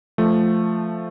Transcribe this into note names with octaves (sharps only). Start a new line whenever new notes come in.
F3 A3